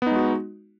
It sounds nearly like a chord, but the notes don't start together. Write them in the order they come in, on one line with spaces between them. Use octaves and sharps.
B3 D#4 G#3 F#4